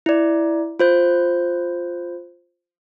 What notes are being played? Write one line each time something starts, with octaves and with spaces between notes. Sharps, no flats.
E4 D5
F4 C5 G6